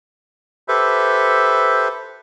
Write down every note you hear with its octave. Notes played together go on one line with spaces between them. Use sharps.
G4 A4 B4 C5 E5